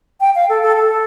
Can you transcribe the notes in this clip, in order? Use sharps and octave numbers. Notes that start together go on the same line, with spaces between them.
G5
F5
A4
A4
A4